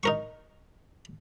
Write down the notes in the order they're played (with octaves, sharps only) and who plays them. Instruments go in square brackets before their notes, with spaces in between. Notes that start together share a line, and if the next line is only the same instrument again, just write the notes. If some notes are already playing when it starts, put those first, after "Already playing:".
[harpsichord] D#4 A#4 C#6